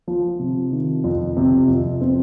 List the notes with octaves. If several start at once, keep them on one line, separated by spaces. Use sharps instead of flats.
F3
C3
D#3
F2
C3
F2
C4